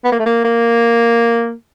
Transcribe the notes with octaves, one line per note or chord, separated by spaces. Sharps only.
B3
A#3
A3
A#3
A#3